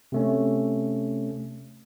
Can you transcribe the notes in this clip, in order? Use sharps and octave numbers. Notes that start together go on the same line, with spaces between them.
C3 A3 C#4